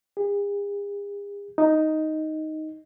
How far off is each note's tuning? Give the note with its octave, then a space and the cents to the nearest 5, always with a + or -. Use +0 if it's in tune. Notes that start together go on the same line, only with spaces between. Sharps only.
G#4 -45
D#4 +5